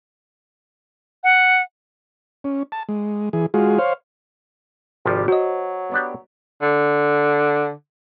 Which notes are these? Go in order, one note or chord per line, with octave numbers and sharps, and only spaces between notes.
F#5
C#4
A5
G#3
E3 G#4
G#3 F4 F#4 G#4
C5 C#5 F5
G#1 C3 F3 G3
F#3 F#4 C5 D#5
B3 D4 G4
D3